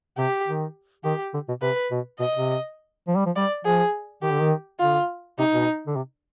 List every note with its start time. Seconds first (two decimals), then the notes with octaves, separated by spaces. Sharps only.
0.18 C3 G4
0.47 D#3
1.04 D#3 G4
1.34 D3
1.48 B2
1.62 C3 B4
1.91 B2
2.20 B2 D#5
2.34 C3
3.08 F3
3.16 G3
3.26 F3
3.36 G3 D5
3.65 F3 G#4
4.22 D#3 G4
4.32 D3
4.41 D#3
4.80 D3 F4
5.38 C3 D#4
5.53 B2
5.87 D3
5.96 C3